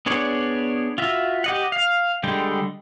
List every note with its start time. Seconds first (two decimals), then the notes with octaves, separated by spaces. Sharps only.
0.06 B3 D4 G#4 C#5 D5
0.98 F4 F#4 E5
1.44 G4 D#5 F#5
1.72 F5
2.23 D3 G3 G#3 G5